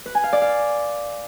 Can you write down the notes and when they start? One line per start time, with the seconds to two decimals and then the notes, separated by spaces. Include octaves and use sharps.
0.06 B4
0.15 G#5
0.24 F5
0.33 D5
0.42 F5